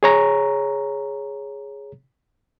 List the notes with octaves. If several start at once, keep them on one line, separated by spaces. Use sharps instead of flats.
G#4 C#5 A#5